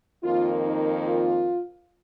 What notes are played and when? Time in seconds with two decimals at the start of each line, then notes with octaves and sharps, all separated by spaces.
0.23 F2 D#3 A#3 F4
0.64 D#4
1.04 F4